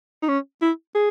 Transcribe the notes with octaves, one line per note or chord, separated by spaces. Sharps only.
D#4
C#4
E4
G#4